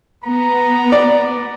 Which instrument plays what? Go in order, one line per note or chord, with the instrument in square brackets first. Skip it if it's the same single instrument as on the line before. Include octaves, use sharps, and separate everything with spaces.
[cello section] B3 [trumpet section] A#5
[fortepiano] D5